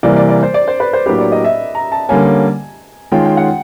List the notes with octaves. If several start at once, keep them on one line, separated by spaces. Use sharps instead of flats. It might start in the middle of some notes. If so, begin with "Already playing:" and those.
C3 E3 G3 A#3 D5
D5
D5
C5
D5
C5
B4
C5
A2 F#3 A#3 D4 G4 B4
D5
D#5
E5
A#5
A5
D3 G3 A#3 C#4 G#5
D#3 G#3 C#4 F4 G5
G5
F#5